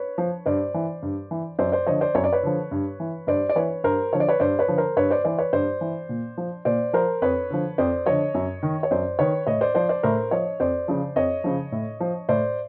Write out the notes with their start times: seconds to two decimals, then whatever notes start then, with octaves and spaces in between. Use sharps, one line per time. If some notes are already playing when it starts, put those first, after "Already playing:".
Already playing: B4 C#5
0.18 F3
0.46 G2 C5 D5
0.74 E3
1.03 G2
1.31 E3
1.59 F#2 C5 D5
1.72 C5 D5
1.87 D3 F3 C#5 D#5
2.01 C5 D5
2.15 F#2 C#5
2.24 D5
2.33 B4 C#5
2.43 D3 F3
2.71 G2
3.00 E3
3.27 G2 C5 D5
3.49 D5
3.56 E3 B4 C#5
3.84 G2 A#4 C5
4.13 D3 F3 C#5
4.20 D5
4.29 B4 C#5
4.40 G2 C5 D5
4.59 B4 C#5
4.68 D3 F3
4.78 A#4 C5
4.97 G2 B4 C#5
5.10 C5 D5
5.24 E3 C5 D5
5.38 B4 C#5
5.53 G2 C5 D5
5.81 E3
6.09 A#2
6.38 F3
6.65 A#2 C5 D5
6.93 F3 A#4 C5
7.22 F2 B4 C#5
7.50 D3 F3
7.78 F2 C5 D5
8.06 D3 F3 C#5 D#5
8.34 F#2
8.63 D#3
8.83 C#5
8.91 F#2 C5 D5
9.19 D#3 B4 C#5
9.47 A2 C#5 D#5
9.61 C5 D5
9.75 F3 C5 D5
9.89 C5 D5
10.03 A2 A#4 C5
10.31 F3 C#5 D#5
10.60 F2 C5 D5
10.88 C#3 F3
11.16 F2 C#5 D#5
11.44 C#3 F3
11.72 A2
12.00 F3
12.29 A2 C5 D5